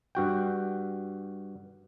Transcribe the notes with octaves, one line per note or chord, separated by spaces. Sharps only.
G2 F#4 G5